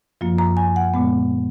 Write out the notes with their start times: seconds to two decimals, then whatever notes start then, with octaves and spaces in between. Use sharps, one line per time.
0.21 F#2 F3 A#3 F4
0.38 A#5
0.57 G#5
0.76 F#5
0.94 A#2 G#3 B3